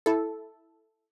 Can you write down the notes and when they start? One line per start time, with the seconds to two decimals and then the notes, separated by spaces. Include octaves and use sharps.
0.06 E4 A4